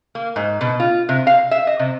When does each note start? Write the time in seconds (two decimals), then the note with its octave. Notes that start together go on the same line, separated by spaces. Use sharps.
0.15 A#3
0.36 G#2
0.61 B2
0.80 F4
1.09 C3
1.27 F5
1.51 E5
1.67 D#5
1.79 C3